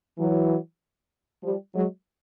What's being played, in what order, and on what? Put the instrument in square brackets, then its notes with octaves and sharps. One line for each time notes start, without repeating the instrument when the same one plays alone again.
[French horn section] E3 F#3
F3 G3
F#3 G#3